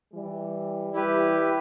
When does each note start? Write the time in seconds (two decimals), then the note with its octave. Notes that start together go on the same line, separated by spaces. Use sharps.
0.12 E3 G3
0.93 E3 G3 E4 G4 B4